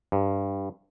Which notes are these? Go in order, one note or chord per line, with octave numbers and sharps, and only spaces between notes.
G2